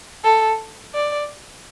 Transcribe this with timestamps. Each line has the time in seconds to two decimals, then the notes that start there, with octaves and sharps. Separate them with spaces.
0.24 A4
0.94 D5